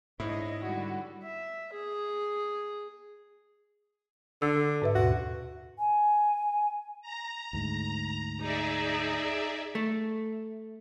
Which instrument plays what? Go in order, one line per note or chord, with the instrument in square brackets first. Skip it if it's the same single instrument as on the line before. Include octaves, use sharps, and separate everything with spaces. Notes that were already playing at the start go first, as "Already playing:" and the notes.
[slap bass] G#2 [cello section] D4 C#5 D#5 [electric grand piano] E4
[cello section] D3 G3 [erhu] F#4
[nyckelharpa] E5
G#4
[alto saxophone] D3 [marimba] E6
[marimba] A4
G#2 B4 E5
[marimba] D#2 G#2 B2 [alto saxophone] F#4
[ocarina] G#5
[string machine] A#5
[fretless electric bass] D2 G#2
[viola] D#4 [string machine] G#4 D5 E5
[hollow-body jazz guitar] A3